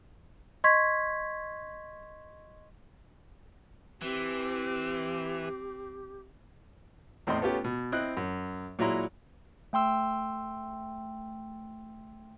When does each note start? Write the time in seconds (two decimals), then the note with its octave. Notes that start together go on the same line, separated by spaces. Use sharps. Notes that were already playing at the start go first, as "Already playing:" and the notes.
0.64 D#5 C6 C#6 G#6 B6
4.02 E3 C4 G4
7.27 E2 A2 C4 D#5 C6
7.41 A3 B3 C#4 F4 G4
7.64 B2
7.92 C4 E4 D#5 F#6
8.17 F#2
8.79 A#2 F#3 G#3 E4 A#5 C6
9.73 A3 G5 C6 E6